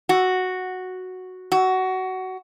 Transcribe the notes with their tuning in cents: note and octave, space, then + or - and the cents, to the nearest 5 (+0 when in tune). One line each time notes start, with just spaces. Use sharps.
F#4 -5
F#4 +15